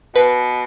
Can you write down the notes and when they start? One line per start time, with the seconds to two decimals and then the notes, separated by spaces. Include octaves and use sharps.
0.15 B2 B4